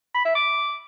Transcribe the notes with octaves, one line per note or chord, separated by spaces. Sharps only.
B5
E5
D6